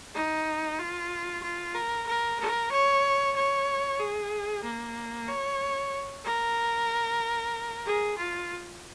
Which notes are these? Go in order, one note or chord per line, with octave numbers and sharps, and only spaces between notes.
D#4
F4
F4
A#4
A#4
A#4
C#5
C#5
G#4
A#3
C#5
A#4
G#4
F4